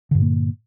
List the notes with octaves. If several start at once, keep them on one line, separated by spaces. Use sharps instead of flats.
G2 A#2 D3 A#3